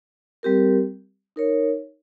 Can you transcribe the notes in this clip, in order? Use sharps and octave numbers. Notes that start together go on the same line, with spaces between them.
G3 C4 G4 A#4
D#4 A#4 C#5